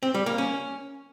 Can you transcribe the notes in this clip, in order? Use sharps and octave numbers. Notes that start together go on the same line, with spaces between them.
C4
G3
A#3
C#4